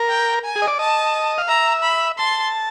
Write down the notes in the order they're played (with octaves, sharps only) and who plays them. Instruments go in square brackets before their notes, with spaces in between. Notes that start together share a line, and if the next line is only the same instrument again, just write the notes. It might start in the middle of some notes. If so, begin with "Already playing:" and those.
Already playing: [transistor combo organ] A#4
[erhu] G5
G#5
[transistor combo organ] G#4
D#5
D5
[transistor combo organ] D#5 [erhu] A5
[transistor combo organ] F5
[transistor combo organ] E5 [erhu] A#5
[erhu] B5
[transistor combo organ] A5 [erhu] C6